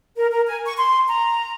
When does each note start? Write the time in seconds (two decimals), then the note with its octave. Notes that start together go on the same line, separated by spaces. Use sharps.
0.16 A#4
0.31 A#4
0.47 G#5
0.66 C#6
0.77 C6
1.09 A#5